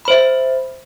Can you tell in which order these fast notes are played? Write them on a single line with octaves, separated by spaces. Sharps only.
B5 C5 E5